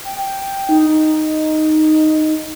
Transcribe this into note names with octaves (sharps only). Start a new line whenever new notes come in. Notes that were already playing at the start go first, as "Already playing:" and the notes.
G5
D#4